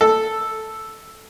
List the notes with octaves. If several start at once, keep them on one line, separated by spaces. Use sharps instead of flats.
A4